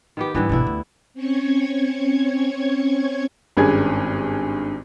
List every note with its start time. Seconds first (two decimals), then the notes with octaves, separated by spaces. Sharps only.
0.17 D#3 B3 G4
0.35 G#2 D3 E3 G3 B3
0.49 G#1 B2 D3 E4
0.67 D2
1.14 C4 C#4 C#5 C#6 G#6
3.57 G#1 G2 C#4 G#4 G#6